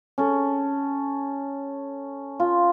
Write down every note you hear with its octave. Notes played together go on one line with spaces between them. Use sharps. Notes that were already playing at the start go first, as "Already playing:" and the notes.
C#4 A4
F4